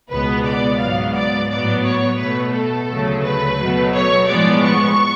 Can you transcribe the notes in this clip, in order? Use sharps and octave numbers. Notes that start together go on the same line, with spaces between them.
C#2 B2 G#3 B3 B4
D5
G#2 F#3 B3 F5
D5
A2 F#3 B3 D5
C#5
B2 A3 B4
A4
D2 C#3 F#3 A3
B4
B2 F#3 A3
C#5
A2 F3 G#3 B3 D5
C#6